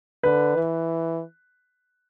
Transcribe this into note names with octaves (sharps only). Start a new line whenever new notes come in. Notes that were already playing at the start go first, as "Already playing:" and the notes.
D3 B4
E3